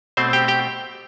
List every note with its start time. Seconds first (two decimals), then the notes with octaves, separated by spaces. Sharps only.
0.17 B2 A3 C4 C5
0.33 G4 G5
0.48 G4 G5